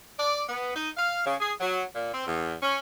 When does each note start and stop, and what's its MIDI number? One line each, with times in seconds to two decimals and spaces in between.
0.18 0.43 74
0.48 0.71 59
0.74 0.88 63
0.97 1.22 77
1.25 1.34 49
1.40 1.52 68
1.60 1.82 54
1.95 2.10 46
2.12 2.27 60
2.27 2.52 40
2.62 2.77 61